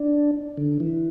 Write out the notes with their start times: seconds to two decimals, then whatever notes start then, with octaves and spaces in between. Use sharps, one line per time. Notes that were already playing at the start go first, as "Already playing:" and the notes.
Already playing: D4
0.57 D3
0.80 E3